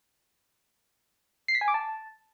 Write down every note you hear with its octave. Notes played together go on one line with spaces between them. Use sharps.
C7
B6
G#5
D6
A5